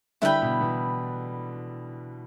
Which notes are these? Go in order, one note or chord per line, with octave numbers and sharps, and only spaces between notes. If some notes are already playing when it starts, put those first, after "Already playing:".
D3 G3 E4 B4 G5 B5
B2
B2 E3